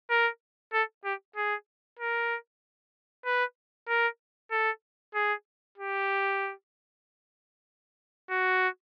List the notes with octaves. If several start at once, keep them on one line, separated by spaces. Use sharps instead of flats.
A#4
A4
G4
G#4
A#4
B4
A#4
A4
G#4
G4
F#4